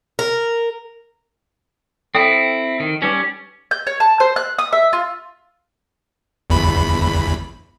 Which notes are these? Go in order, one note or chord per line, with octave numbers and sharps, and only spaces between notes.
A#4
C4 E4 A4 C5 G5
D#3
G3 C#4 D#4 B4 D6
G6
C#5
A5
C5
F#6
D#6
E5
F4
G1 E2 B5